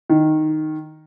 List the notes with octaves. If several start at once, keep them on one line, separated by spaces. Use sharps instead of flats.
D#3